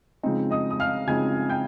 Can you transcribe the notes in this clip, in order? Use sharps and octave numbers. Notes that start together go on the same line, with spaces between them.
C#3 F3 G#3 C4 D#4
D#5 D#6
D#6
F5 F6
C#3 F3 G#3 C4 D#4 G#5 G#6
G5 G6